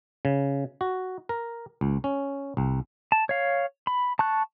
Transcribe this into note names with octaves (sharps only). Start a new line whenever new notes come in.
C#3
F#4
A#4
C#2
C#4
C2
A5
C#5 F5
B5
A5 C#6 F#6